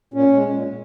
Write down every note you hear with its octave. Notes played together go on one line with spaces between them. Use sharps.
A#2 C#4
G#3
A#2